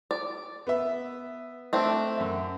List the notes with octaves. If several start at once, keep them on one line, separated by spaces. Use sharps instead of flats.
D5
B3 E5
A3 C4 D4
F#2 E5